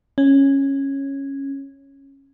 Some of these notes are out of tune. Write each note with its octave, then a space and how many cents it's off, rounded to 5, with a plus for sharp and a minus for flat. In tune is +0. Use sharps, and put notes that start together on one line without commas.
C#4 -10